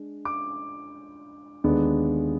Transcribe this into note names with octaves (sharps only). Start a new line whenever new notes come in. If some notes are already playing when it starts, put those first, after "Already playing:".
Already playing: G#3 D4
D6
D#2 D3 G#3 B3 D4